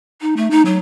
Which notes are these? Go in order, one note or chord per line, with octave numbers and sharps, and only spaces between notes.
D#4
A3
D#4
F#3